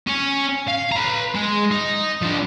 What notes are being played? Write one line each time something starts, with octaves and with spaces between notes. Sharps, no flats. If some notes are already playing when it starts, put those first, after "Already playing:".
C#4
F5
B4 A#5
G#3
D#4
F3 D4